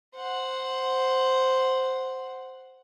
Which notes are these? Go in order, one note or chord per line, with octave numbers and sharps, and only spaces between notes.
C5 F#5